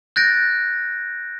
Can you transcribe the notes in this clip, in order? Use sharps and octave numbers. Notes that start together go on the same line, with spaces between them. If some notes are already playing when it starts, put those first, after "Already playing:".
F#6 G6 A6 A#6 D7